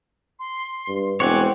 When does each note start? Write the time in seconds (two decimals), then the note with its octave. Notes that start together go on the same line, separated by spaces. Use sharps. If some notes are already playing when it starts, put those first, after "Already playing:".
0.39 C6
0.89 G2
1.20 E1 C4 C#5 F#5 G#5 D6